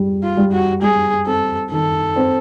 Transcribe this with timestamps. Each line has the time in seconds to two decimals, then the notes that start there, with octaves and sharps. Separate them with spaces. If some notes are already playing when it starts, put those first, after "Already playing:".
Already playing: G3
0.23 F4
0.37 G3
0.52 F#4
0.82 G3 G#4
1.26 C4 A4
1.71 D#3 A4
2.16 C4